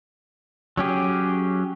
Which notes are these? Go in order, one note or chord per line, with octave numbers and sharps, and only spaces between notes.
F#3 C#4 G4 G#4